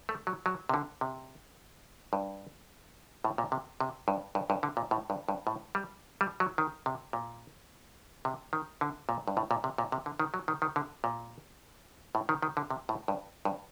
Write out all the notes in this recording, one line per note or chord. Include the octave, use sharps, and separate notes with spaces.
A3
F#3
F#3
C3
D3
C3
G2
A2
A#2
C3
C3
G2
G2
G2
D3
A#2
A2
G2
G2
A2
G3
G3
F#3
D#3
C3
A#2
C3
D#3
D3
A#2
G2
A2
A#2
C3
A#2
C3
D3
D#3
F#3
D#3
D#3
D3
A#2
A2
D#3
D#3
D3
C3
A2
G2
G2